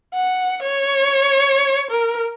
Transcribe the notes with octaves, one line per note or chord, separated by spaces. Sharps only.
F#5
C#5
A#4